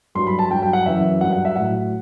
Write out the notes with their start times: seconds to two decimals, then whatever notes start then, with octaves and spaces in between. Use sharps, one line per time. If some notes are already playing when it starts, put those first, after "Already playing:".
0.15 G2 F#3 C6
0.27 B5
0.39 A5
0.50 G2 F#3 G5
0.62 G5
0.73 F#5
0.86 F#2 E3 E5
1.21 G2 F#3 F#5
1.33 F#5
1.45 E5
1.56 A2 F#3 F#5